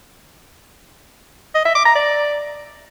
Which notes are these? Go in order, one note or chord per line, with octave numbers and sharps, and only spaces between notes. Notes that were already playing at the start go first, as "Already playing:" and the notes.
D#5
E5
D6
A#5
D5